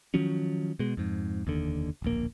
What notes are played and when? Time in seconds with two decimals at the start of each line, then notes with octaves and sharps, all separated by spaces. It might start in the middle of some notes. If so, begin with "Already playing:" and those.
0.14 D#3 F3 F#3 C#4
0.79 B2 G#3
0.97 F2 G#2
1.45 F1 D#2 D3
2.02 D1 A#1 A#3